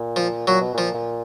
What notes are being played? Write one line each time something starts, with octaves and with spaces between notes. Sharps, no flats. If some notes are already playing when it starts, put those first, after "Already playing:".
Already playing: A#2
F3
A#2 F#3
B2
A#2 F3
A#2